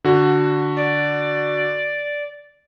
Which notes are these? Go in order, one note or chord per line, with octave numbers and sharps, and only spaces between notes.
D3 F#4
D5